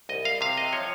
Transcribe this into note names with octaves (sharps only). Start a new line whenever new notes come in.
C2 D#5
F5
C3 F5
D#5
F3 C#5